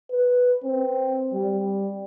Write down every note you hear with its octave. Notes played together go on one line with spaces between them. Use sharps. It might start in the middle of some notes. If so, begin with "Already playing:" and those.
B4
C4
G3